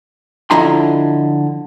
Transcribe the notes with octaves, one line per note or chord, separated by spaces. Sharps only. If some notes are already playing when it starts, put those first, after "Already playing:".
D3 F3 E4 D#5 A#5 C6